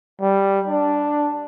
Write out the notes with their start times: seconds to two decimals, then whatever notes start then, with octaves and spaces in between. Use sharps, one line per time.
0.21 G3
0.68 D4